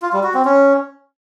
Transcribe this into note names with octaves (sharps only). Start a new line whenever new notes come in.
F4
G3
F#4
C4
C#4